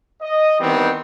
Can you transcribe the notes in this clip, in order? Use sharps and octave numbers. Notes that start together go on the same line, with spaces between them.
D#5
D#3 E3 G3 B3 C4